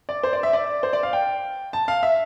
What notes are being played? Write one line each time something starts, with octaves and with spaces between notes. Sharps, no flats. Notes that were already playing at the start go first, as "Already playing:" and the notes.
D5
C5
D5
E5
D5
C5
D5
F5
G5
A5
F5
E5